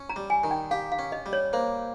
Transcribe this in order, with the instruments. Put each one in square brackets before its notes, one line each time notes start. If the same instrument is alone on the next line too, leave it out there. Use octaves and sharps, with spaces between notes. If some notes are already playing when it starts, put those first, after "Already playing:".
Already playing: [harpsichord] C#4
[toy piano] A#5
[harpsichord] G3
[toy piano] G#5
[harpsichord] D#3
[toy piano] G5
[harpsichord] G4 [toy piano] F5
[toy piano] F5
[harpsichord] C#4
[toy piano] D#5
[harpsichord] G3
[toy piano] C#5
[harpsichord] A#3 [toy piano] C5